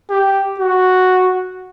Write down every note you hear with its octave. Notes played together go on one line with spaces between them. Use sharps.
G4
F#4